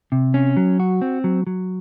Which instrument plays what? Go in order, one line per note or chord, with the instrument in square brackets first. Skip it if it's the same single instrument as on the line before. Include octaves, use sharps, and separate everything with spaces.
[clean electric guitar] C3
C#4
F#3
F#4
C4
F#3
F#3